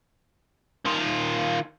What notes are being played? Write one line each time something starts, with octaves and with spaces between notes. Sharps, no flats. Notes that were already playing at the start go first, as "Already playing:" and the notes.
D#3 F4